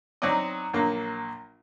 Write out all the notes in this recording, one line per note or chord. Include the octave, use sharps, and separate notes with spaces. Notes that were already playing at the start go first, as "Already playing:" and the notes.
F#3 C4 D#4 D5 D#5
A#1 F#3 A#3